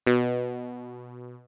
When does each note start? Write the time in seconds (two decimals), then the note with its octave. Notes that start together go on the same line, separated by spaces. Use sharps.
0.07 B2